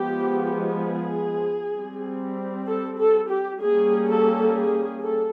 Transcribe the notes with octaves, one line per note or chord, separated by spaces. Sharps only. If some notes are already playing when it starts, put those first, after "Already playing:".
Already playing: F3 G#3 B3 G4
G#4
G3 C4
A4
A4
G4
G3 A#3 C#4 G#4
A4
G#4
A4